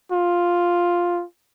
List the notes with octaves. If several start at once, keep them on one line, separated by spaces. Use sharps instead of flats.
F4